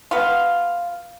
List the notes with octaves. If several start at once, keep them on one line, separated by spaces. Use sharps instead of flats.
B3 F4